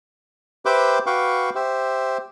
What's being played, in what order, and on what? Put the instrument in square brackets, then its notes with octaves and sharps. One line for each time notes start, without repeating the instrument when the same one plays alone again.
[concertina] G4 B4 C5 E5 G5 D6
F#4 B4 F5 G5 C#6 D6
G4 C5 E5